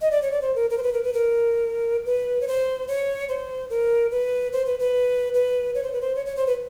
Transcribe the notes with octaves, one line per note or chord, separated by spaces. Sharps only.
D#5
D5
C#5
D5
C5
A#4
A#4
C5
B4
A#4
B4
A#4
B4
C#5
C5
C#5
C5
A#4
B4
C5
B4
B4
B4
C#5
C5
B4
C5
C#5
C#5
C5
B4